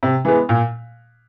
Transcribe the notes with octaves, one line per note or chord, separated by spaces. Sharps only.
C3
E3 G#3 B3
A#2